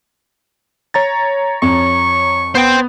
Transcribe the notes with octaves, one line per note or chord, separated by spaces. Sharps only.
C#5 A#5 A6
F2 C#6
B3 C5 G5